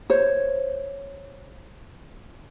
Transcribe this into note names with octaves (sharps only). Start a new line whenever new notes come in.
C5 C#5